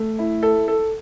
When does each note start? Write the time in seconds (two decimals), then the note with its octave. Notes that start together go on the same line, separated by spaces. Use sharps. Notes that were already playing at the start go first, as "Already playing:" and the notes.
Already playing: A3
0.19 E4
0.43 A4
0.68 A4